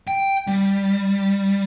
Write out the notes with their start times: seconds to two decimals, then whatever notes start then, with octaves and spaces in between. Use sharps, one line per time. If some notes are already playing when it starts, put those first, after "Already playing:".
0.07 G5
0.47 G3